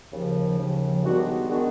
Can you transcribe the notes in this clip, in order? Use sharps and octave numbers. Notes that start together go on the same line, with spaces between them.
D#2 C#3 F3
D#2 C#3 F3
G2 D#3 G#3 B3 D4 F#4
D#3 G#3 B3 D4 F#4